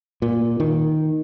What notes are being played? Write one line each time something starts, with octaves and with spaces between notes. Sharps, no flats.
A#2
D#3